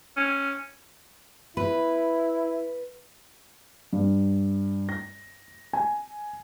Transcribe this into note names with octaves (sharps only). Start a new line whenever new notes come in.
C#4
E4 B4
G2
A#6
G#5